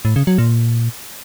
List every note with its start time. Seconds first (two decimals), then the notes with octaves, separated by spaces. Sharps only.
0.05 A2
0.16 C#3
0.27 F#3
0.38 A#2